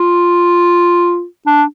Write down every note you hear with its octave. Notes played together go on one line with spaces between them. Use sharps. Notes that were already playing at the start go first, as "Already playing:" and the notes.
Already playing: F4
D4